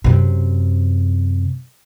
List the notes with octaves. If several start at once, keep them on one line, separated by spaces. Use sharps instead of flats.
F#2 C3